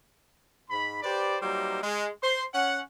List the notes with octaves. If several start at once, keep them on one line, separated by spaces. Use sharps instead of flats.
G#2 B5
G4 B4 C5 D5
F#3 G3 A#3 D#4 C5
G#3
C5 C6
C#4 F#5